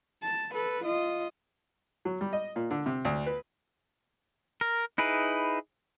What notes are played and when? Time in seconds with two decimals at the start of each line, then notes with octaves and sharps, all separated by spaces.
0.22 A5
0.54 A4 B4
0.85 F4 D#5
2.05 F#3
2.21 G3
2.33 D#5
2.56 A#2
2.71 D3
2.86 C3
3.05 D2
3.26 B4
4.61 A#4
4.98 D#4 E4 G#4 B4